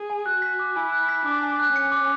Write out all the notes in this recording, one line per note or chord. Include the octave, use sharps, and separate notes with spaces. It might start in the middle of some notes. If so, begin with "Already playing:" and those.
Already playing: G#4
G#5
F#4 F#6
B6
D6
E4 G#5
F#6
B6
D4 D6
G#5
F#6
C#4 C#7
D6